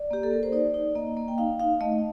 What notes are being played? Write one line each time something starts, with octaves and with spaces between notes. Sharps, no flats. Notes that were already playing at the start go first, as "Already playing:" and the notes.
Already playing: D5
A#3 G4
A4
A#3 A#4
C5
D#4 D5
D#4
A#3 D#5
A#3
G5
D#4 F5
D#4 F5
A3 D#5